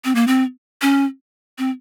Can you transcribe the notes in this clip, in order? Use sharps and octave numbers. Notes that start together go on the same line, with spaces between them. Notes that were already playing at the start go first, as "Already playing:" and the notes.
C4
A#3
C4
C#4
C4